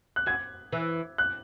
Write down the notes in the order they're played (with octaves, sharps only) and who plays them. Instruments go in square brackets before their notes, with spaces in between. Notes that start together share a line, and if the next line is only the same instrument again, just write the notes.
[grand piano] F#6
[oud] F#2 [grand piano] G#6
[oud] E3
[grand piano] F#6